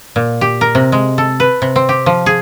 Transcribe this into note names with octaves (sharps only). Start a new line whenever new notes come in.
A#2
G4
A#4
C3
G#3
A4
B4
C3
C4
G4
F3
G#4